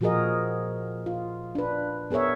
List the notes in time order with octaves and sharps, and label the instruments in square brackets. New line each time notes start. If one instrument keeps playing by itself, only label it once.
[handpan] A#2 F3 F#4 G#4 A#4 D#5
F4
D4 B4
B3 G#4 A#4 C#5 E5